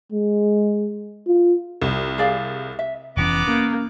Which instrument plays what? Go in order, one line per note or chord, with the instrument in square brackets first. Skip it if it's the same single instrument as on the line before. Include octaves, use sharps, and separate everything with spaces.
[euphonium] G#3
F4
[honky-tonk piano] C2
[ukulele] G#4 D5 F5
E5
[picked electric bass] F1 E3 C#4 [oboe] B3 [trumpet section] D5 A#5 D6
[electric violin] A#3 [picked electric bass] C#4